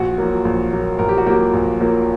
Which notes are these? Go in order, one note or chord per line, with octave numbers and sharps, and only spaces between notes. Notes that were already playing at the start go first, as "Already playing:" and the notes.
Already playing: A#1 F#4
A#2 F#3 A#3
A#1
A#2 F#3 A#3
A#1 A#4
G4
F#4
A#2 F#3 A#3 G4
A#1
A#2 F#3 A#3